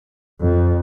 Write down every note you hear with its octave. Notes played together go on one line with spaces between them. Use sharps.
F2